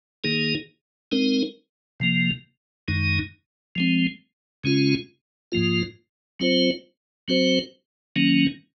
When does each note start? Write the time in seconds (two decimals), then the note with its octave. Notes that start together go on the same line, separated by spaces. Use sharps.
0.24 D#3 A#3 D#4 G#4
1.12 G#3 C4 D#4 A#4
2.00 C3 F3 A#3
2.88 F#2 D#3 G#3 D#4
3.76 F3 G#3 C4
4.64 C#3 G#3 C#4 F4
5.52 G#2 F3 A#3 F4
6.40 F#3 C4 F4 C5
7.28 F#3 C4 F#4 C5
8.16 D#3 F#3 A#3 C#4